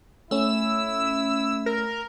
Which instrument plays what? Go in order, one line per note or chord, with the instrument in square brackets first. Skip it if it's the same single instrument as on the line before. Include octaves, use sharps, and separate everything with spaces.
[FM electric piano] A3 C#4 [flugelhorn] E4 [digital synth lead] E6
[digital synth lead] A#4